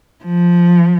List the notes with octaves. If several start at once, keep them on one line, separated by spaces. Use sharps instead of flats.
F3